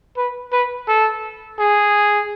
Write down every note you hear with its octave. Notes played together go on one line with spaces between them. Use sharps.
B4
B4
A4
G#4